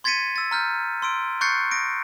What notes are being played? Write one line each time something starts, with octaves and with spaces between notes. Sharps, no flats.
C6 G#6 A6 B6 C#7 D#7
E6 A6
A#5 F6 G6
C6 E6 D7
C#6 F#6 G6 A6 C7 C#7
D#6 A#6 D7